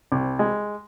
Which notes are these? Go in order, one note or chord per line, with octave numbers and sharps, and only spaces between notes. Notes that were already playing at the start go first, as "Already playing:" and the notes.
C2
G#3